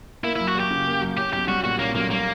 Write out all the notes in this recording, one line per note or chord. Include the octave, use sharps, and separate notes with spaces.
A#3 E4
F#2 E4
F#4
F#3 G4
C#3
A#3
F#2
C#4 G4
B1 G4
G3 F#4
A#2 F#4
A#3 C#4
B1 A#3
G3 A#3